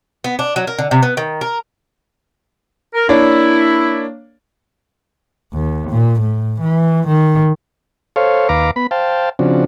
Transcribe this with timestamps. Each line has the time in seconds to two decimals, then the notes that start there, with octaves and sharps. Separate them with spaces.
0.24 B3
0.39 D4
0.56 F#3
0.67 A#4
0.79 D3
0.91 C3
1.03 B3
1.17 D#3
1.41 A#4
2.94 A#4
3.09 A#3 D4 E4 C#5
5.53 D#2
5.90 A#2
6.20 A2
6.61 E3
7.07 D#3
8.16 A4 C5 C#5 F5
8.49 D#2 B4 F5 A#5 D6
8.76 B3 B5
8.91 C5 F5 G5 A5
9.39 C#3 F3 C4 D4 F#4